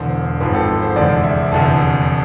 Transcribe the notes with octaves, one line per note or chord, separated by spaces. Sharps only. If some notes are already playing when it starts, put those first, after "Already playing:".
Already playing: E1 E2 D3 C5
G#1 G#2 F3 G#3 C4 B4
A4
C5
F1 E2 D3 G#3 D5
E5
F1 E2 D3 A5